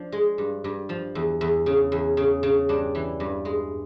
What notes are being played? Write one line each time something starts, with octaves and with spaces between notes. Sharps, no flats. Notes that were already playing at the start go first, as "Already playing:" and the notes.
Already playing: F3 D4
G#3
G2
G2
F3
E2
E2
C#3
E2
C#3
C#3
G2 D4
E3
G2
G#3